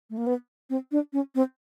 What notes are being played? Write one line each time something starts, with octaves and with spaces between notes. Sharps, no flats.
A3
A#3
B3
C4
D4
C#4
C4